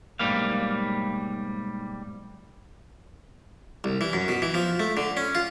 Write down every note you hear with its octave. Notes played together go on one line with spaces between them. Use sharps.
B1 G#2 G3 A#3 F5
C2
E3
F#2
B2
E3
F3
A3
D3
C#4
F4